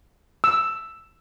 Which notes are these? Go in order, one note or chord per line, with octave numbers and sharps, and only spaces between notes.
E6